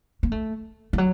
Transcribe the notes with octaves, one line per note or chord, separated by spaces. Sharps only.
A#3
A3
F3
F#3